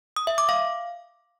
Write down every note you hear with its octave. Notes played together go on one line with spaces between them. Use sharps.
D#6
E5
D6
F5